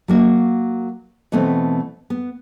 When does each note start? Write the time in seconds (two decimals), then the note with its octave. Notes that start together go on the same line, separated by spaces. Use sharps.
0.08 F#3 A#3 F#4
1.32 B2 E3 A3 B3 C4
2.10 B3